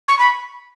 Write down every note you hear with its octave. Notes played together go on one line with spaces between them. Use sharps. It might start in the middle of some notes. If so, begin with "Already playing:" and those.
C#6
B5